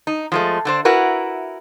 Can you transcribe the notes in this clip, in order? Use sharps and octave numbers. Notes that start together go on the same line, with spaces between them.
D#4
F3 G#3 A3
D3 D4 C5
E4 F#4 A#4 B4